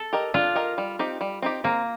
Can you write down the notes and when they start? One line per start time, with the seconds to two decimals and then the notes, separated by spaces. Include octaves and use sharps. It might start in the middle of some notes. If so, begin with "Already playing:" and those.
Already playing: A4
0.13 G4 A#4 D#5
0.34 D4 F4
0.55 G4 A#4 D#5
0.78 G3
0.99 C4 D#4 G4
1.21 G3
1.42 C4 D#4 G4
1.64 A#3 C4